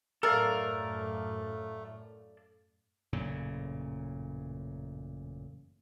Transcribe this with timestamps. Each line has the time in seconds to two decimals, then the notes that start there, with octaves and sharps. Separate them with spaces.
0.23 F#2 A2 A3 A4 A#4 D5 F5
3.13 A1 F#2 A#2 C#3